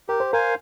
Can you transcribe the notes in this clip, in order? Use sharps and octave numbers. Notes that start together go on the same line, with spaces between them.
G4 A#4
C5
A#4 C5 F5 G#5